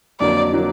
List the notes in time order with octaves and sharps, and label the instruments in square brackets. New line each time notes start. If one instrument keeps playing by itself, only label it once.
[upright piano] F2 D3 F#3 A#3 [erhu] D5
[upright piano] D3 F#3 A#3